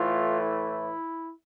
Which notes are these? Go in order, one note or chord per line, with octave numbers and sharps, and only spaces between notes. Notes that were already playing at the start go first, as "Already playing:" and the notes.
Already playing: A2 E3 A3 F4
E4